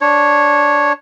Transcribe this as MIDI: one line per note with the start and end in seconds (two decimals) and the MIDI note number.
0.01 0.92 62
0.01 0.92 73